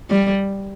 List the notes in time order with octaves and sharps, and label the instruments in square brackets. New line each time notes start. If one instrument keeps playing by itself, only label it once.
[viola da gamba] G3